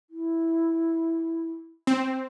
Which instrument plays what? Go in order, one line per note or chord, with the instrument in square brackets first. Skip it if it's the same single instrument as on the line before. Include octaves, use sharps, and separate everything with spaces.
[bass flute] E4
[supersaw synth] C4